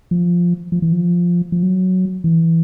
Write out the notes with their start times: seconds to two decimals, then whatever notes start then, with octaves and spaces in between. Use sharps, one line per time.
0.11 F3
0.72 F3
0.82 E3
0.92 F3
1.52 F3
1.63 F#3
2.24 E3